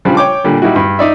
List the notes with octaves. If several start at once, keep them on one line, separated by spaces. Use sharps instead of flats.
C#3 F3 G3 D4
C#5 G5 D6
A#2 D3 G3
G3 D#4 E4 F#4
G2
D#4 D5 E5